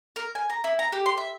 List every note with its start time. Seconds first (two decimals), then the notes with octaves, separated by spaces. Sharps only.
0.16 A#4
0.35 G#5
0.50 A#5
0.64 E4
0.79 A#5
0.92 G4
1.06 C6
1.17 E5